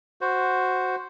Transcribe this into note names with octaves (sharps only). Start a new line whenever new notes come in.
F#4 C5